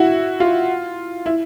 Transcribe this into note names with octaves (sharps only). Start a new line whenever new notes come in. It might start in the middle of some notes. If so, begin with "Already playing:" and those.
Already playing: E4 F#4
F4
E4